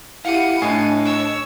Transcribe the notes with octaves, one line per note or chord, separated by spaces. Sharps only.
E4 G4 F5 F#5 C#7 D#7
A2 D4 D#5 G#5 C7
C#5 E6